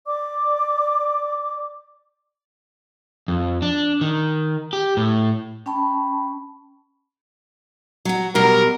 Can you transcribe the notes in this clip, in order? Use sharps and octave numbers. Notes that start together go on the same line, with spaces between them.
D5 D6
F2
D4
D#3
G4
A2
C#4 G5 A5 B5 C#6
F#3 F#4
B2 F#3 G3 A#4